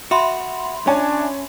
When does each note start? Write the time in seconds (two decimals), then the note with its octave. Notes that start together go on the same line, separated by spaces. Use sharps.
0.11 F#4 E5 B5 C6
0.87 C#4 D4 C#5 G#5 A5